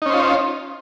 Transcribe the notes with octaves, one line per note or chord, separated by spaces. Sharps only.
C#4 D#4 F4 C5